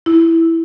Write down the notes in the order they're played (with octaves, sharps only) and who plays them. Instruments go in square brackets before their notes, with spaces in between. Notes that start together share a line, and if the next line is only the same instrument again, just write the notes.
[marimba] E4